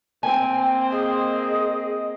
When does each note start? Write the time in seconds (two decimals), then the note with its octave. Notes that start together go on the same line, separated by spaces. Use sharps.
0.23 A#3 C4 G5 G#5
0.91 G#4 D#5